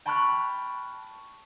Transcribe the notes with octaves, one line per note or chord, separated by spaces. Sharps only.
G5 A5 B5 C#6 F6 F#6